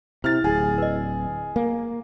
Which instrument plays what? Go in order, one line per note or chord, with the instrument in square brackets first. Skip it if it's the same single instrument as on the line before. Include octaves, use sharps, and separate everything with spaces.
[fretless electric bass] C3 [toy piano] E4 [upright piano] F6 A6
[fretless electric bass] D1 [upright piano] G#4
[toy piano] B4 D#5
[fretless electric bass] A#3